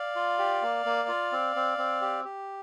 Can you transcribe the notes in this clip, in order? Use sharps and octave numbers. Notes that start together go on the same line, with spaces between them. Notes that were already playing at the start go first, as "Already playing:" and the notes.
Already playing: D5 F5
F4
G4
A#3
A#3
F4
C4
C4
C4
G4
G4